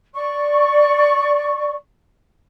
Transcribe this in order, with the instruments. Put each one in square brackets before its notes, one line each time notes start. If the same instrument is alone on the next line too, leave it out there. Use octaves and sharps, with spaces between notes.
[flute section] D5 C#6